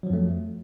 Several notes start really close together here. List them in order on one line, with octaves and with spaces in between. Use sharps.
F#3 F3 F2 A3